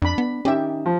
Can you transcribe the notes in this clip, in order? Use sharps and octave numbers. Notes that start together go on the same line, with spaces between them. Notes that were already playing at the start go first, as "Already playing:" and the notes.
F2 D4 B5
B3
D#3 C#4 G4 E5
F3